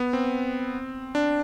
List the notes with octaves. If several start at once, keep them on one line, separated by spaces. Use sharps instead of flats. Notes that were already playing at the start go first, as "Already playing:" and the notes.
Already playing: B3
C4
D4